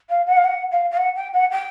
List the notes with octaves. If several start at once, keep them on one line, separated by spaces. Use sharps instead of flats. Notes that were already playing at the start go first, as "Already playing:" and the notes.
F5
F#5
F5
F#5
F5
F5
F#5
G5
F#5
G5